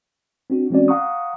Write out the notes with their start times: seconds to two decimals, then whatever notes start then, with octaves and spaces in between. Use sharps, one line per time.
0.50 C4 D4 F#4
0.70 E3 G#3 C4 C#4 F#4 D5
0.88 F5 F#5 A#5 C#6 D#6